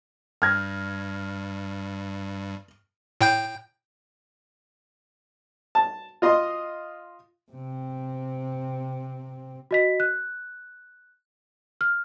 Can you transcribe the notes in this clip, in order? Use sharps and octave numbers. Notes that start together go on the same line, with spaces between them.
G2 F6 G#6 A#6
A2 G5 G6
A5
F4 D#5 C6
C3 C4
F#4 D#5 B6
F#6
F6